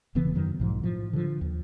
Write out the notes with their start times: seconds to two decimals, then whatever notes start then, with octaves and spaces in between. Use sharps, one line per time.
0.15 E1 C#3 E3 B3
0.35 F#2 D#3 F#3
0.60 B1 G#2 F3
0.83 A2 F3
1.13 D3 E3 F3
1.41 D#2